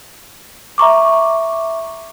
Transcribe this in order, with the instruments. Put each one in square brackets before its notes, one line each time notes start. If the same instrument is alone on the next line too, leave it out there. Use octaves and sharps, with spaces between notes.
[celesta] E5 A#5 C#6 D6